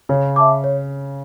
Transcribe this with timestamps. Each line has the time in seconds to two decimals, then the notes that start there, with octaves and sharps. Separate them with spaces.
0.09 C#3 C#5
0.36 E5 A5 D6
0.64 C#5